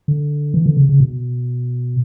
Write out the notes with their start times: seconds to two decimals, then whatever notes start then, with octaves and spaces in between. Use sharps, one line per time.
0.08 D3
0.54 E3
0.66 D3
0.77 C#3
0.89 C#3
1.00 B2